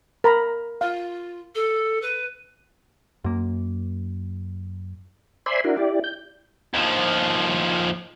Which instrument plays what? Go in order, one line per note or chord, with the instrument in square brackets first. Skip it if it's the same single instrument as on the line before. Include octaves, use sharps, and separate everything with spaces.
[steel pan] A#4 A#5 B5
[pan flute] F4 [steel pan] F5
[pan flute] A4
B4
[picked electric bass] F#2 A#3
[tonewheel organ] C5 D5 E5 G#5 B5 C6
D4 E4 F#4 A#4
E4 G4 D5
G6
[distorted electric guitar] D#2 F3